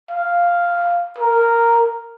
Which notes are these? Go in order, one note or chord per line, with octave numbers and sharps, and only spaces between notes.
F5
A#4